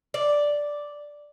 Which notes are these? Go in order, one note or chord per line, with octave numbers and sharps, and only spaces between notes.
D5